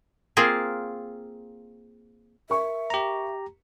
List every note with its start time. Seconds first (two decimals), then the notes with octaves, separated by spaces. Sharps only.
0.37 A#3 C4 F4 G#4 A#4
2.50 A#4 E5 C#6
2.90 G4 A#5